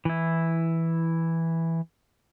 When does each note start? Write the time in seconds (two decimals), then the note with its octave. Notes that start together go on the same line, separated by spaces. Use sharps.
0.05 E3 E4